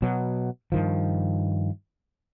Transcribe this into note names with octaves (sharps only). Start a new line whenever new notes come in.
B2 F#3
G2 D#3 F3